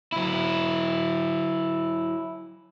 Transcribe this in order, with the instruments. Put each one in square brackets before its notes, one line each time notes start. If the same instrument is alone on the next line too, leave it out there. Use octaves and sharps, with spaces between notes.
[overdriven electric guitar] F#3 E4